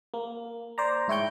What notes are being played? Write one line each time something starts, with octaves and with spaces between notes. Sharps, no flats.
A#3
C5 D5 A#5
G#2 E4 C#5 G5 G6